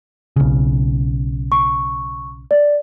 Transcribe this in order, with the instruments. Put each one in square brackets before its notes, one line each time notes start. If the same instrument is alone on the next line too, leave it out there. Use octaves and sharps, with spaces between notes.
[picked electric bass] B1 C#3
[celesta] C#6
D5